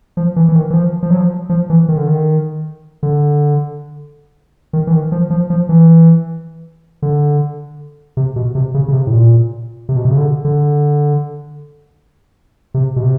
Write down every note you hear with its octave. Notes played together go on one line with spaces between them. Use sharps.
F3
E3
E3
D#3
E3
F3
F3
F#3
F3
F3
E3
D#3
D3
D#3
D3
D#3
E3
D#3
F3
F3
F3
E3
D3
C3
B2
C3
C#3
C#3
C3
A2
A#2
C3
B2
C3
C#3
D3
D3
C3
B2
C3